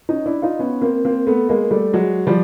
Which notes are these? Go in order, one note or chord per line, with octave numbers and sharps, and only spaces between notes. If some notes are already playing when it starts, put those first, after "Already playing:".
C#4 D#4
D4 E4
D#4 F4
B3 C#4
A#3 C4
A#3 C4
A3 B3
G#3 A#3
G3 A3
F#3 G#3
F3 G3